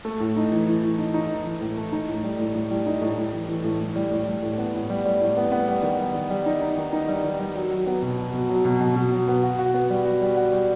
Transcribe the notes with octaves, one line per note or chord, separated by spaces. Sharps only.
A3
A2
D#4
E3
E3
E3
D#4
D#4
E3
E3
A2
A3
D#4
A2
G3
A2
A2
G3
D#4
A2
A2
E3
E3
A2
A2
G3
A2
G3
A2
B3
A2
G3
G3
A2
B3
B3
G3
D#3
G3
D#3
G3
D#4
D#4
D#3
D#4
G3
D#3
G3
F#3
F#3
B3
B2
F#3
B2
F#3
B2
B2
B2
F#3
B3
F#4
F#4
B3
G3
F#4
G3
F#4
G3